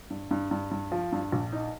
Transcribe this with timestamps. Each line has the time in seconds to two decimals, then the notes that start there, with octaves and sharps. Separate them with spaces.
0.10 G2
0.31 G2
0.51 G2
0.71 G2
0.92 F3
1.12 G2
1.32 A#1
1.52 D#4